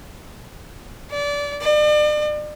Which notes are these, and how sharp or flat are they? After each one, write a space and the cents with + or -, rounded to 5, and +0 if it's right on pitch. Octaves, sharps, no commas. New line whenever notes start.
D5 -25
D5 +40